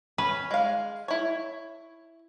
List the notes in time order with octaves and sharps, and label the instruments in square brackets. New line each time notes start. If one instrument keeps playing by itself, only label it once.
[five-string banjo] C#4 [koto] B4
[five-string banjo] G#3 F5
E4 C#5